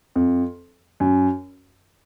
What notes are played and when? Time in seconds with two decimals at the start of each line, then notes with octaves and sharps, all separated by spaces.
0.16 F2
1.00 F#2